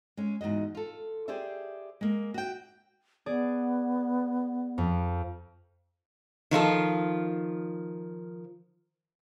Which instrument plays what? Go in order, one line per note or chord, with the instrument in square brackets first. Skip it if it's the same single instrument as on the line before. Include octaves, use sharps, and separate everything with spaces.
[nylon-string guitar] G#3 C#4
E2 G#2 C3 F#4 D#5
F4 A4
G4 G#4 C5 D5 E5
G#3 A#3
F#4 E5 G5
[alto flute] B3 [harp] G#4 D5
[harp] F2
[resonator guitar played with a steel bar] D#3 F3 F4 A4